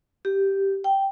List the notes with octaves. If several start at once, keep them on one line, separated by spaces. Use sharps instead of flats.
G4
G5